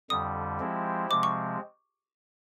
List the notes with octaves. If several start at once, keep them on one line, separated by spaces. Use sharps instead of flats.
F2 D3 G3 D#6
F3 G#3 C4 E4 G4
C3 F3 G#3 C4 D6
C#6